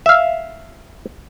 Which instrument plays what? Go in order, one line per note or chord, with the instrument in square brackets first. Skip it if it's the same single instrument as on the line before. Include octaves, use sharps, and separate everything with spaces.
[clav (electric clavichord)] E5 F5